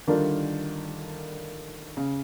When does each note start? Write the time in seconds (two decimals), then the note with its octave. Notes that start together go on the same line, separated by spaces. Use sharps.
0.07 D3 D#3 G3 D4 F4 A#4
1.97 C#3